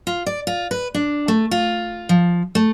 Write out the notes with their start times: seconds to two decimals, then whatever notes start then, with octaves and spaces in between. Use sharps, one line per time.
0.07 F4
0.26 D5
0.47 F4
0.71 B4
0.95 D4
1.28 A3
1.51 F4
2.09 F3
2.55 A3